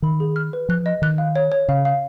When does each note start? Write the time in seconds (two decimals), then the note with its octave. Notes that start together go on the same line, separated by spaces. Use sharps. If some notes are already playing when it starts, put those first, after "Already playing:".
0.02 D#3 B5
0.20 G#4
0.36 F6
0.53 B4
0.69 F3 F#6
0.86 D#5
1.02 D#3 F#6
1.18 F5
1.36 C#5
1.52 C#5
1.68 C#3 F5
1.85 F5